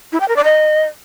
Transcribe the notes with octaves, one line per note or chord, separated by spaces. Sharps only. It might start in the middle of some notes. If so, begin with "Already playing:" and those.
E4
G5
A#4
D5
D#5